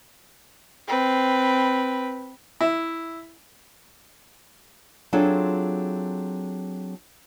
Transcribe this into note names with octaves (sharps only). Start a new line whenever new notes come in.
C4 B4
E4
F#3 C4 D4 F4 G#4 A4